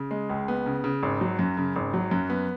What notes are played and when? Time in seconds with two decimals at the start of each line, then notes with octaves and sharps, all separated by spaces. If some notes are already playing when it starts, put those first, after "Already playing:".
Already playing: C#3
0.11 G#3
0.29 C#2
0.48 B3
0.66 C#3
0.84 C#3
1.03 G#1
1.21 F#3
1.39 F#2
1.57 C#3
1.76 G#1
1.94 F#3
2.11 F#2
2.30 B3